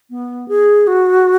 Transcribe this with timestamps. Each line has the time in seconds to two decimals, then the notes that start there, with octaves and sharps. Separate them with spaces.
0.10 B3
0.48 G#4
0.87 F#4